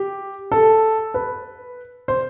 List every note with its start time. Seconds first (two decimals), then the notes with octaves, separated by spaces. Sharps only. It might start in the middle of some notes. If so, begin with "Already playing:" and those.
Already playing: G4
0.52 A4
1.14 B4
2.08 C5